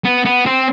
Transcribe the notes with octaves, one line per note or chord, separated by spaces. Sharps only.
B3
B3
C4